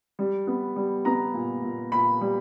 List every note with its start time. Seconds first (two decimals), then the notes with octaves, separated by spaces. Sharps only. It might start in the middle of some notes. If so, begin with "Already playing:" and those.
0.19 G3
0.47 B3
0.76 G3
1.05 B3 A#5
1.34 A#2
1.63 A#2
1.92 A#2 B5
2.21 G3